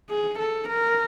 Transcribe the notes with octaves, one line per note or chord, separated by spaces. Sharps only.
G#4
A4
A#4